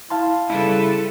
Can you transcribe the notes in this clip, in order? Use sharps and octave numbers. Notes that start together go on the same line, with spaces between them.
E4 F5 A5 C6
C#3 G3 E4 A4 B4